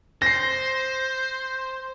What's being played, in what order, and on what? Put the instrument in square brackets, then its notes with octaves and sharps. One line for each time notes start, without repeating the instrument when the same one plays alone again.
[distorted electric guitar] C5 [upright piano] A#6 C7